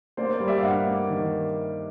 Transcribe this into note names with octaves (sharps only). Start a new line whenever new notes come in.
A#3 C5 D5
C5 D5
G3
D5 E5
F5
G2 E5 F#5
A#3
D#3